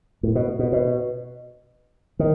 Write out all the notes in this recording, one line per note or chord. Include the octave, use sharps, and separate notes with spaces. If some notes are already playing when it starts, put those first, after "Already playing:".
A2
B2
B2
B2
D#3